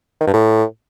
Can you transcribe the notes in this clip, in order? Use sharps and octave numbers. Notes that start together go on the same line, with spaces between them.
D#3
G2
A2